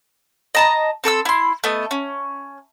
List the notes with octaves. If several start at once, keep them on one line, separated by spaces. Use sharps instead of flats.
D#5 A5 A#5
C4 A4 D6 E6
E4 C6
A3 B3 D#5
C#4